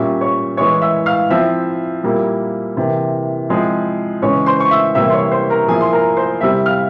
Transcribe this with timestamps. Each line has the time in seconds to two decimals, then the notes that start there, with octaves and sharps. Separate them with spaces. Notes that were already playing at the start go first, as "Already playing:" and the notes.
Already playing: A#2 G3 C#4 E5
0.21 C#5 C#6
0.57 E3 G#3 E4 C#5 C#6
0.81 E5 E6
1.06 F5 F6
1.30 F3 C4 E4 E5 E6
2.04 A#2 G3 A#3 E4
2.77 C3 E3 A#3
3.49 F3 G#3 C4 E4
4.22 C#3 E3 G#3 C#4 C#5 C#6
4.46 C5 C6
4.60 C#6
4.71 E5 E6
4.95 C3 E3 G3 A#3 E5 E6
5.09 C6
5.13 C#5 C#6
5.31 C5 C6
5.50 A#4 A#5
5.68 F3 A#3 E4 G#4 G#5
5.81 C6
5.92 A#4 A#5
6.17 C5 C6
6.41 C3 G3 C4 E4 E5 E6
6.66 F5 F6